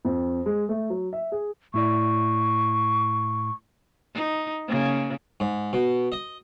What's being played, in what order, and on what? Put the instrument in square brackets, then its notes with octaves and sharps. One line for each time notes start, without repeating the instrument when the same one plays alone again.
[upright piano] F2
G#3
A3
F#3
E5
G#4
[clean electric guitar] A2 E4 D5 [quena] C#6
[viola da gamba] D#4
C#3 A#3
[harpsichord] G#2
B2
D#5